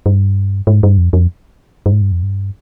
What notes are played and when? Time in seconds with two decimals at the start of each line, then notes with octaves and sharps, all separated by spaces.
0.06 G2
0.67 G#2
0.83 G2
0.98 F2
1.13 F2
1.86 G2
1.92 G#2
2.02 G2
2.12 F2
2.23 G2